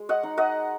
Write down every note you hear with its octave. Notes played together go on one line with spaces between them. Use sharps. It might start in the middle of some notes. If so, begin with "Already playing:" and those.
Already playing: G#3
D#5 F#5
D#4
D#5 F#5